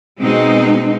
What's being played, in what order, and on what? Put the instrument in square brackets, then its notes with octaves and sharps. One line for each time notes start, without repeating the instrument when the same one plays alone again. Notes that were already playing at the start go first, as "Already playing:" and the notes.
[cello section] B2 G#3 C4 D#4